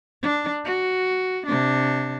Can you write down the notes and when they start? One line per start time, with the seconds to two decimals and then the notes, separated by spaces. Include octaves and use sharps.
0.22 D4
0.65 F#4
1.47 C3 D4